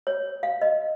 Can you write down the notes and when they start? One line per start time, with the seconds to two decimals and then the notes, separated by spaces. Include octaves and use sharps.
0.07 C#5
0.43 F5
0.62 D#5